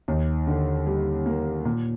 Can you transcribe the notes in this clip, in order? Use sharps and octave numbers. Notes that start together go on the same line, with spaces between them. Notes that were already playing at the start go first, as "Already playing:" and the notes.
D#2
D3
G3
A#3
A#2